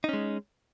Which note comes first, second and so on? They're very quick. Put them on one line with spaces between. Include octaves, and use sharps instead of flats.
D#4 C#4 G#3